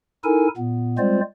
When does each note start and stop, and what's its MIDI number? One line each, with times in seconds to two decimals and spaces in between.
0.24 0.48 63
0.24 0.48 64
0.24 0.48 69
0.24 0.48 70
0.24 0.48 80
0.57 0.98 46
0.57 0.98 59
0.98 1.21 55
0.98 1.21 56
0.98 1.21 60
0.98 1.21 65
0.98 1.21 72
0.98 1.21 74